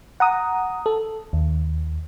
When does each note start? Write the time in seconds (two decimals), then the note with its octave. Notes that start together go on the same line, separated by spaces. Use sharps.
0.20 F#5 A#5 D#6
0.86 A4
1.33 D#2